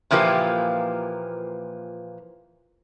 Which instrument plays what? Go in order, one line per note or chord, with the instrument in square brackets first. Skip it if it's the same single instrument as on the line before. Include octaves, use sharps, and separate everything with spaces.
[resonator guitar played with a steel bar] A#2 E3 F3 A#3 G4